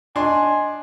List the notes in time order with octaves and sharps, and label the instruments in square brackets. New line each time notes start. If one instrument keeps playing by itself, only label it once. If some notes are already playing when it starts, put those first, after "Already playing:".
[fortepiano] D4 [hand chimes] D#5 C6 C7 [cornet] G#5